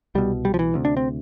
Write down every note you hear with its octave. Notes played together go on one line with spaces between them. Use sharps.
C2 B2 G3
G3
F3
E3
D2 C3
D4
C4